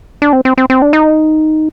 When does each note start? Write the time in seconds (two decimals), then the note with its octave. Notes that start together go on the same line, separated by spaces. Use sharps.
0.22 D4
0.33 C4
0.45 C4
0.58 C4
0.70 C4
0.82 D4
0.93 D#4